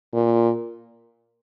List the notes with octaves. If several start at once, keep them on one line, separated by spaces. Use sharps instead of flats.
A#2